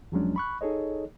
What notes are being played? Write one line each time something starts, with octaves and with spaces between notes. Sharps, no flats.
E2 F3 F#3 G#3 C#4 D4
B5 C#6 F#6
D#4 G#4 A4 C#5 D#5